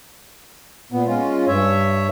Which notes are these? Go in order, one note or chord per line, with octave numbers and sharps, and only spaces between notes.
A#2 B3
G#3 C#4 F4
G2 C#5 E5